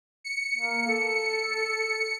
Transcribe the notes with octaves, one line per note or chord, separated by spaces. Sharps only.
C#7
A#3
A4